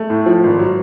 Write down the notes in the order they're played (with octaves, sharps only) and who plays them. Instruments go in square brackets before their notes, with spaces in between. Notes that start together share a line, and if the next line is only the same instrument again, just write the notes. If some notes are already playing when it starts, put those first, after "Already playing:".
Already playing: [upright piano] A3
A2
F3
G#1
F#3